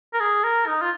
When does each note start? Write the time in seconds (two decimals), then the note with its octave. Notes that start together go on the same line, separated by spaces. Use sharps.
0.14 A#4
0.21 G#4
0.44 A#4
0.67 D#4
0.82 F4